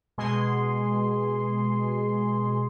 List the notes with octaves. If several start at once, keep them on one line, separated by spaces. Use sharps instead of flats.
B2 G#3 G#4 C6